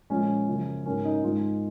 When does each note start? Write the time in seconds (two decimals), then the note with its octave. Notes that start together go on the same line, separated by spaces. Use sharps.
0.10 A#2 F3 G#3 C#4
0.48 F#2 C#3 F3
0.86 G#2 F#3 A#3 C#4
1.05 D#4
1.23 G#2 D#3 G#3 F4